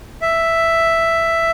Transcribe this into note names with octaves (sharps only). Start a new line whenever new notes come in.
E5